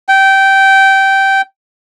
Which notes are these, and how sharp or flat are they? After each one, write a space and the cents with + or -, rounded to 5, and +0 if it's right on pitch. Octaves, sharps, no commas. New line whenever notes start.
G5 -15